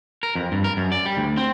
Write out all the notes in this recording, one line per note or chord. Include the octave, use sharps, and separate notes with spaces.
A#4
F2
G2
A#4
F#2
D5
G3
D2
C4